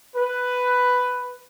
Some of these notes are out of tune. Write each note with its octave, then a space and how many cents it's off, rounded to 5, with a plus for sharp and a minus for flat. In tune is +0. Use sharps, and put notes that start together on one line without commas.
B4 +5